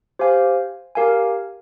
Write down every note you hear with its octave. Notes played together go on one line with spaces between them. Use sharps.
G4 C5 F5 G#5
G4 A#4 F5 G#5